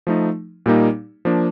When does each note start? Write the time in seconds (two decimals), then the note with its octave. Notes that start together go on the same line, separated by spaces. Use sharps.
0.07 F3 A3 D#4
0.66 A#2 G3 A#3 D#4
1.25 F3 A#3 D4